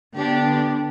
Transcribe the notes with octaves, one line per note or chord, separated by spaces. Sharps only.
D3 B3 D4 G4